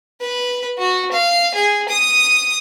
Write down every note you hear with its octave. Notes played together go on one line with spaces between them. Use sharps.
B4
F#4
F5
G#4
D#6